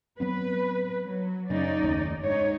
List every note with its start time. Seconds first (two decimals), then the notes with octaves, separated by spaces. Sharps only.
0.20 F#3 B3 C4 B4
1.07 F#3
1.50 F#2 C#3 C#4 D#4 D5
1.82 F#1 D#2 A3
2.24 G#2 D#4 C#5